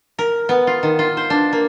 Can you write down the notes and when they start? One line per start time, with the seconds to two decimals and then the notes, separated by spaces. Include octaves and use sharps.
0.19 A#4
0.49 B3
0.67 F4
0.83 D#3
0.99 F4
1.17 C5
1.30 D4
1.53 A#3